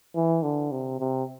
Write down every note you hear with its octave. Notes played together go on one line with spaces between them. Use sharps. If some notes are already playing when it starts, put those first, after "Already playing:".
E3
D3
C3
C3